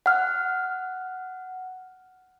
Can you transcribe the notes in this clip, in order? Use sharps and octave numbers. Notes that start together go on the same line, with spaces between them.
F#5 F6